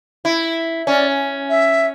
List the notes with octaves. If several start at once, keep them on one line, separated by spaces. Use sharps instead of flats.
E4
C#4 D5
E5